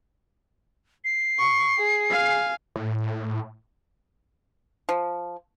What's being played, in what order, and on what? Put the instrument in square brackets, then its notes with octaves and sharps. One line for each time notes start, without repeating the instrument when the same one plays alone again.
[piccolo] C7
[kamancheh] C#6
G#4
[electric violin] F5 G#5
[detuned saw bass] A2
[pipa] F3